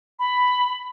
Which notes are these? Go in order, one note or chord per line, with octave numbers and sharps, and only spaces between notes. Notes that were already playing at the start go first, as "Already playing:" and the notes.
B5